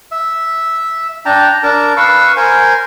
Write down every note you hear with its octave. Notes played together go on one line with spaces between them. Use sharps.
E5
D4 G5 A5 A#5
D4 A#4 A5
B4 F5 C#6 E6
A#4 C5 G#5